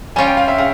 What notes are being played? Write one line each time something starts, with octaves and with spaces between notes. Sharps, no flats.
G3 C#4 F4 G#5
G5
F5
E5
C#3 F5